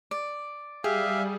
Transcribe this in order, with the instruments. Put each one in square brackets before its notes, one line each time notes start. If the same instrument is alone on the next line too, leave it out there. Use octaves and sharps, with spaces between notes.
[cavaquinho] D5
[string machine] G3 [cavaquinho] G4 [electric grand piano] G#4 [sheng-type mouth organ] E5 F5